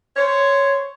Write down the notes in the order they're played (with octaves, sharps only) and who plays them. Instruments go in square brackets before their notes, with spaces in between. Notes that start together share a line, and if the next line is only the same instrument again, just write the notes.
[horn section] C5 C#5